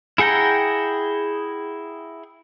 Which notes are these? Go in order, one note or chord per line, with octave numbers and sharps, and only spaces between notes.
E4 G#4 F#5 G5 A#5